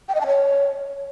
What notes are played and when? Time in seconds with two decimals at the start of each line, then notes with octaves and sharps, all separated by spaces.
0.09 G5
0.15 D#5
0.21 A5
0.27 C#5